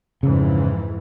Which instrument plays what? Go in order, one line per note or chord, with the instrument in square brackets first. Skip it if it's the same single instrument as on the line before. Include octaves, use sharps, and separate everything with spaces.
[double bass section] F2 G#2 E3 [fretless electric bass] C#3